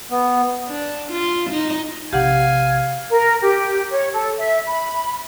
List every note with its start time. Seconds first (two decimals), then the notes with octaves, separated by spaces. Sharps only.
0.10 B3
0.69 D4
1.12 F4
1.50 D#4
2.13 A#1 C3 G4 F5 F#5 G#5
3.11 A#4
3.41 G4
3.91 C#5
4.13 A4
4.37 E5
4.68 B5